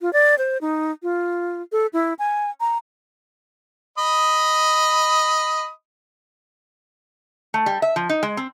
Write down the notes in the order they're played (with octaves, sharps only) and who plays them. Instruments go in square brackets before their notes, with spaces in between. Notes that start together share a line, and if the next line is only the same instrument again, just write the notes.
[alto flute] F4
D5
C5
D#4
F4
A4
E4
G#5
A#5
[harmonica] D#5 B5 D#6
[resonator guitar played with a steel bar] A3
G3
E5
F3
D#4
G#3
C4